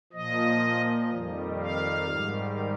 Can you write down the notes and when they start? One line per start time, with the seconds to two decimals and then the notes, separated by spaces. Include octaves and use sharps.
0.13 A#2 F3 D#5
1.12 F2 D#3 G3
1.60 F5
2.09 G#2 D#3 G3